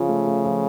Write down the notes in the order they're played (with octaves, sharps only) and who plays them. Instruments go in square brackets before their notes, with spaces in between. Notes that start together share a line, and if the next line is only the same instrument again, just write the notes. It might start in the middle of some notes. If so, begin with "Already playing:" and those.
Already playing: [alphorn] C#3 [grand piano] F3 F4
[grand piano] A3
A3
F3